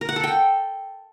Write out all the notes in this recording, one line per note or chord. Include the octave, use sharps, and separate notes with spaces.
A#4
F#5
A4
G5